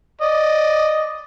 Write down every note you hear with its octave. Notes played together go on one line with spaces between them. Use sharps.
D5 D#5